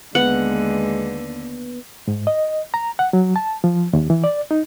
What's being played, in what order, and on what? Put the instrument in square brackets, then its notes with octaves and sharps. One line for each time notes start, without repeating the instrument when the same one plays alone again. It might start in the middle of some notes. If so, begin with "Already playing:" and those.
[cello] D#2 D3 [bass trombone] G#3 [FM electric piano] B3 B4 [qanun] F#5
[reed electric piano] G#2
D#5
A#5
F#5
F#3
A5
F3
D#2
E3
D5
D#4